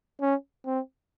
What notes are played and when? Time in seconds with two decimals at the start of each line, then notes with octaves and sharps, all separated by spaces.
0.21 C#4
0.66 C4